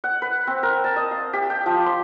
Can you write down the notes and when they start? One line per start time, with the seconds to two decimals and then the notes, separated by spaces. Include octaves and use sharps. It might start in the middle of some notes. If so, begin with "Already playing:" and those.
0.04 F#5
0.22 B4
0.47 C4
0.63 A#4
0.84 A5
0.96 D#5
1.11 F5
1.33 G4
1.50 G5
1.66 F3
1.86 C6